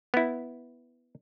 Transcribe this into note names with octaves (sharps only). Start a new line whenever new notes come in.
B3 E4